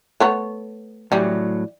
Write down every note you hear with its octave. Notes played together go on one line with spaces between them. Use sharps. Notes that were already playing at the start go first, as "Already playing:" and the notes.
A3 B3 C#5
A2 E3 F#3 G3